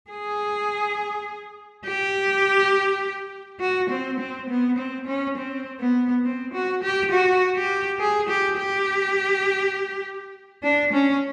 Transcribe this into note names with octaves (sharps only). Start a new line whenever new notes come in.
G#4
G4
F#4
C4
C4
B3
C4
C#4
C4
B3
C4
F#4
G4
F#4
G4
G#4
G4
G4
D4
C#4